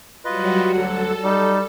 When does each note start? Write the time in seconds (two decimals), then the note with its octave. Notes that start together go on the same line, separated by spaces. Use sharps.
0.25 F#3 G3 F4 F#4 B4 D#5
0.73 D2 F#3 A4 F#5
1.24 G3 D#4